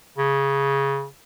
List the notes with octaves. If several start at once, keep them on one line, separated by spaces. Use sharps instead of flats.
C#3